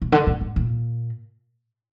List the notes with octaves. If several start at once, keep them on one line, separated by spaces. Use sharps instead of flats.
B2
D3
A#2
G#2
A#2